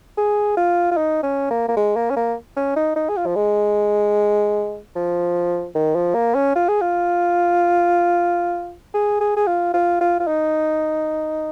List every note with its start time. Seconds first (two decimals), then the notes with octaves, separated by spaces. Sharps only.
0.18 G#4
0.57 F4
0.92 F4
0.97 D#4
1.23 C#4
1.51 A#3
1.69 A#3
1.77 G#3
1.96 A#3
2.10 C#4
2.17 A#3
2.57 C#4
2.76 D#4
2.96 D#4
3.09 G#4
3.17 F4
3.26 F3
3.36 G#3
4.96 F3
5.75 D#3
5.96 F3
6.15 A#3
6.35 C#4
6.56 F4
6.68 G#4
6.81 F4
8.94 G#4
9.21 G#4
9.37 G#4
9.47 F4
9.74 F4
10.01 F4
10.20 F4
10.27 D#4